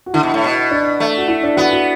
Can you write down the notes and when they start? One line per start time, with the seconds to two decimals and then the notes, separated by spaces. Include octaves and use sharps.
0.06 F#4
0.14 D3 E4
0.23 B2
0.34 A2
0.44 B2
0.71 D4
1.00 A3
1.18 F#4
1.28 E4
1.43 D4
1.57 B3 F#4
1.71 F#4